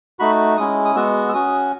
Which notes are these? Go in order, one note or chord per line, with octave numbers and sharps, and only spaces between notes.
A3 D#4 F#4 B5
G#3 C#4 E4 D#6
D#6
G#3 B3 F#4 E6
E6
C#4 F#4 D#6